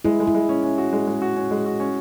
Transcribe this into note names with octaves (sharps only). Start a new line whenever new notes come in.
G#3 E4
G#3
E4
G#3
C#4
C#4
F#4
G#3
G#3
F#4
C#4
G#3
F#4
C#4